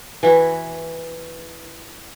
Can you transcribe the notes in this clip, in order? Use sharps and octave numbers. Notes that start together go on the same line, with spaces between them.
E3 E4 F#4